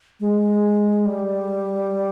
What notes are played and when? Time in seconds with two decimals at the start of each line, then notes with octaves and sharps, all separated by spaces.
0.20 G#3
1.05 G3